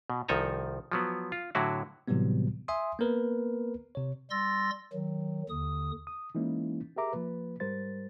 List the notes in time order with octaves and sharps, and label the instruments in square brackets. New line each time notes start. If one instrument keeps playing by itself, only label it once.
[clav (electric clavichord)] B2
C2 D#3 F3 A4 G#5 A#5
F3 F#3 B3
F4
A2 D3 F#3 E4 F#4
[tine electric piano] A2 C3 E3 F#3 G3 B3
E5 G#5 C6 D#6
A#3 B3 A#4 B4
C3 C#5
[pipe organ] G3 C6 E6 A6 A#6
D#3 F#3
D#2 D3 D#6
[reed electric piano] D#6
E3 G#3 A#3 C#4 D#4 E4
G4 G#4 A#4 E5 A#5 D6
F3 A#3 B4
G#2 G3 A#4 C5 A6